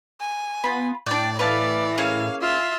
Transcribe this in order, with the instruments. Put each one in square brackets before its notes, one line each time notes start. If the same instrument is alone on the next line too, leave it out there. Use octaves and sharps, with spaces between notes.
[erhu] G#5
[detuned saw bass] B3 [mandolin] F4 B5
[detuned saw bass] A2 [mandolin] D4 G5 [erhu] D5
[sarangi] E3 [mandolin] B4 F5 A5 [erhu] D5
[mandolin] A#3 C#4 G#4 [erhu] F5
[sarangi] F4 [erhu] E5